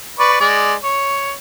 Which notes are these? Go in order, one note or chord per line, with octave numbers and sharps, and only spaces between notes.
B4 D5 C#6
G#3 D5
C#5